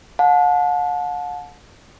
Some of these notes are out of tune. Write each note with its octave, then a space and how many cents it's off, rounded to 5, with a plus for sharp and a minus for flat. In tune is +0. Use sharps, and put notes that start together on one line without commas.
F#5 -45 A5 -25